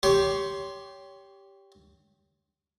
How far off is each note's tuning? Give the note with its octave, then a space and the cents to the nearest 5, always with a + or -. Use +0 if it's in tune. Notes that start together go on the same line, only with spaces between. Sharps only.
G4 +0 C#5 +25 C6 +0